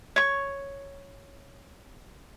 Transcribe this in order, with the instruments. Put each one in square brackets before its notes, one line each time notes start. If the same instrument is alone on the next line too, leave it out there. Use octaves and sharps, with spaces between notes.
[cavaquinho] C#5 C#6